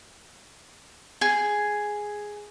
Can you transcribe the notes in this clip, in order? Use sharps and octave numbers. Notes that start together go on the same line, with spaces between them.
G#4